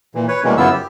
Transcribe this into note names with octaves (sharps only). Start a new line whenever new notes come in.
A#2 E3
B4 C#5
B2 E3 G3 G#3 A#3 C#4
F#2 C#3 B3 E4 F4 E6
G4